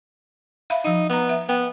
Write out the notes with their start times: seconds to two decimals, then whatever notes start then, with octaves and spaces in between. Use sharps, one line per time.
0.70 E5 F5 B5
0.84 F3 D#4 F5
1.10 B3 F#5 A#5
1.29 E5
1.49 B3 G5